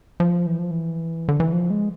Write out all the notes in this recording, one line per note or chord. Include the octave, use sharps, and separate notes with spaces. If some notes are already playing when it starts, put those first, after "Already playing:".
F3
E3
F3
E3
D3
E3
F3
G#3